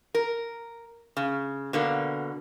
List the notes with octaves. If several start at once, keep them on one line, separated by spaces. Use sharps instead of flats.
A#4
C#3
B2 D3 A#3